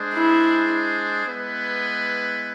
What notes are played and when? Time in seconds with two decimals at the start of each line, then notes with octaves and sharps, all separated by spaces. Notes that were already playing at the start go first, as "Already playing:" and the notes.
Already playing: G#3 D4 G#4 C5
0.14 E4
1.26 G#3 B3 E4 B4